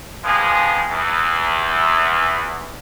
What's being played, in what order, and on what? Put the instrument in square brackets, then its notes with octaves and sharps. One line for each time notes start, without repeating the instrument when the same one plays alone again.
[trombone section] F3 G3 G#3 B3 G#4
E2